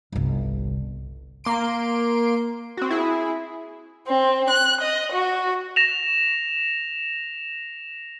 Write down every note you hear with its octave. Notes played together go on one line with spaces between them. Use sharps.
G1 C2
A#3 C6 D7
C4 F#4
E4 G#4
C4
F#6
D#5
F#4
A#6 E7 F7